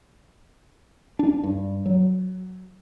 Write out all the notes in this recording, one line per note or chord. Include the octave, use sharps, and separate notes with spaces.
D4
G2
F#3